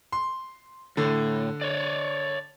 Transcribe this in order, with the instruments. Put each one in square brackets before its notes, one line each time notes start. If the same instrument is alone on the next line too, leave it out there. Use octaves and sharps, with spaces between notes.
[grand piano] C6
[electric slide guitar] A2 [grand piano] D3
[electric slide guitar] C#5 D5